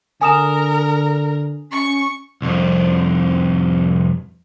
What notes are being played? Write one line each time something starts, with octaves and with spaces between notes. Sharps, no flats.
D3 A#4 G#5 D#6 E7
C#4 C#6
C2 F2